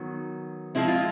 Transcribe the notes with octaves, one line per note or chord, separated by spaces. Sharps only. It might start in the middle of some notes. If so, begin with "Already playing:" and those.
Already playing: D#3 F#3 B3
F3 G#3 C4 E4
F4